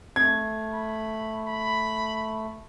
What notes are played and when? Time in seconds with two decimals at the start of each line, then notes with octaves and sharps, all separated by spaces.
0.16 A3 G#6
0.73 B5
1.47 B5